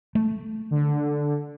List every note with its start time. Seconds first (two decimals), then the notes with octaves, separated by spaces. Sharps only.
0.15 A3
0.71 D3